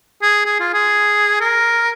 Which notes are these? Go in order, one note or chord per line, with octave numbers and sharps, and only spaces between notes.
G#4
G#4
F4
G#4
A#4